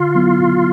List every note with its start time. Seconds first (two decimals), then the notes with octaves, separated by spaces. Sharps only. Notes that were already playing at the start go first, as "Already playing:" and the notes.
Already playing: D3 F4
0.15 F#3 B3 E4